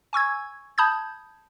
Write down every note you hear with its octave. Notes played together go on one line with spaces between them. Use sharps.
G#5 C#6 E6 G#6
A5 B5 D#6 G6 G#6